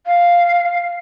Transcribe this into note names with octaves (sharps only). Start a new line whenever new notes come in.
F5